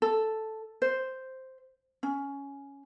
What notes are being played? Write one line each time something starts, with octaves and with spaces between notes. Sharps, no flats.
A4
C5
C#4